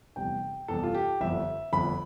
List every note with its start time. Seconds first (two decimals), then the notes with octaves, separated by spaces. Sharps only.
0.16 F1 E2 C3 G3 G5
0.68 F1 E2 C3 G3 A4
0.83 F4
0.95 G4
1.21 G1 F2 D3 E5
1.73 G1 F2 D3 B5